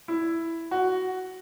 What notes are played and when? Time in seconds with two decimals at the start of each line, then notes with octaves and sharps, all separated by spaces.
0.08 E4
0.71 F#4